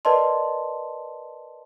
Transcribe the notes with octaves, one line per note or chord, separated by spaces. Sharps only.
A#4 B4 D5 D#5 A5 C6